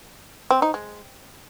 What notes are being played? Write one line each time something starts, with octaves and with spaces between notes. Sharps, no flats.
C4
D#4
G#3